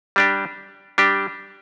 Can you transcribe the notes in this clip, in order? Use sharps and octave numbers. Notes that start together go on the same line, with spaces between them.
G3 D4 G4
G3 D4 G4